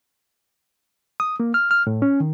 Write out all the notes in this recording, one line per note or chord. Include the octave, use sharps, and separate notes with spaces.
D#6
A#3
F6
F6
A2
C#4
D#3